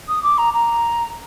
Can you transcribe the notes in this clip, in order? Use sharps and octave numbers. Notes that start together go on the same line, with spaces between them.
D#6
D6
A#5
A#5